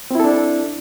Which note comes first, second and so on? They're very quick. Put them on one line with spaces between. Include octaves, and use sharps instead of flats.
C4 E4 A4 D4